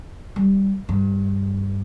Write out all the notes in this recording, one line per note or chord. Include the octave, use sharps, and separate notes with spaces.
G3
G2